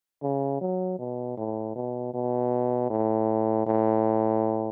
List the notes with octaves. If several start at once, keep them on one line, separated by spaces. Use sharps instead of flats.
C#3
F#3
B2
A2
B2
B2
A2
A2